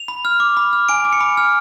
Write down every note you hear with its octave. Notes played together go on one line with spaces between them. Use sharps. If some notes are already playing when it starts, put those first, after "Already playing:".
Already playing: F7
B5
F6
D6
B5
F6
G#5 D7
D6
C#7
B5
F6